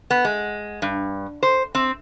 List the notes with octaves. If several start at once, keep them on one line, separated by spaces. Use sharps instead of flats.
B3
G#3
G2
C5
C4